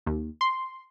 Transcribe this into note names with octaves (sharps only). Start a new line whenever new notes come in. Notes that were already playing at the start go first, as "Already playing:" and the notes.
D#2
C6